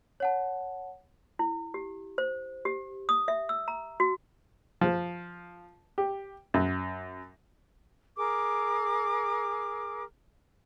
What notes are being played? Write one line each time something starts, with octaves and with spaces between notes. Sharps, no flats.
C#5 F#5 A5
E4
G4
C5
G4
D#6
E5
E6
A#5
F#4
F3
G4
F#2
G#4 A#4 D6